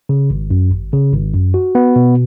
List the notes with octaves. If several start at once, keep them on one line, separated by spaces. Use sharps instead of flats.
C#3
G#1
F#2
G#1
C#3
G#1
F#2
F#4
B3
B2